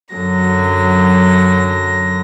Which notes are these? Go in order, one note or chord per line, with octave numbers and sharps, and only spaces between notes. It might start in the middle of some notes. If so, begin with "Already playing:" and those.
F#2 D3 F#3 A#6